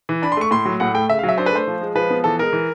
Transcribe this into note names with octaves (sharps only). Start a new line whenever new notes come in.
E3
D4 B5
C6
A3 C#6
A2 C6
F#3
A2 F#5
A3 G5
C#3 E5
F5
F#3
E5
D4 C5
B4
A3 C5
F3
G#3
F3 B4
B3
E3 A4
G#3 A#4
E3